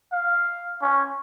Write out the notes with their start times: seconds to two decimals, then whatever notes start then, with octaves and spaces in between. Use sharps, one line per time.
0.12 F5
0.82 C#4